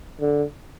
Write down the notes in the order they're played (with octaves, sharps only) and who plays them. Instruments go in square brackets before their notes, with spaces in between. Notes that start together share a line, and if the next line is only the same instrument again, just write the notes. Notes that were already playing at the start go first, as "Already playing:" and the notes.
[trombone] D3